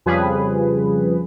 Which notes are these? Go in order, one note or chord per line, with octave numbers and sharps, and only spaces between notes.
F2 C#3 F3 G3 G#4 B4